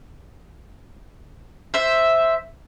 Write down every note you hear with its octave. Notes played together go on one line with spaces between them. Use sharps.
C5 E5